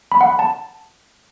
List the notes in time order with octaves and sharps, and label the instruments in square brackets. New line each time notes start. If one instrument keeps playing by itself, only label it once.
[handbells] B5
F#5
B5
A5